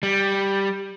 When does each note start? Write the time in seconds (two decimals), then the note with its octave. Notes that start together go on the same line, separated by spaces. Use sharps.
0.03 G3